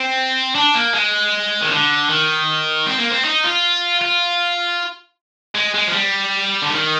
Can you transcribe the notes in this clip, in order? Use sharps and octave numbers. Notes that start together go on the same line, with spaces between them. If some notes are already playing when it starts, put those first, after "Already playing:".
Already playing: C4
D4
A#3
G#3
D#3
D3
D#3
C4
A#3
C4
D#4
F4
F4
G#3
G#3
F3
G3
D3
D#3